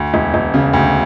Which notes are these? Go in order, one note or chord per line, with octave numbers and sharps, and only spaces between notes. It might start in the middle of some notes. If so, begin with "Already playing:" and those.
Already playing: D2
E1
E1
C#3
D2